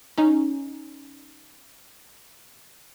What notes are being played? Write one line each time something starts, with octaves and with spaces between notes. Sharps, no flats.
C#4 D#4